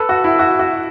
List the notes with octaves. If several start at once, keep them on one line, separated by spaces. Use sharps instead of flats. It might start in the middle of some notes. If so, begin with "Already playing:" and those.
Already playing: A4 B4
F#4
E4
F#4
F#4